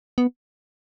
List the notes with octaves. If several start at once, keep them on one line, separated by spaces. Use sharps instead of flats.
B3